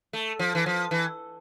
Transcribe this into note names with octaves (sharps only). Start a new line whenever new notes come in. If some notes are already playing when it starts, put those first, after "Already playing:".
A3
F3
E3
F3
E3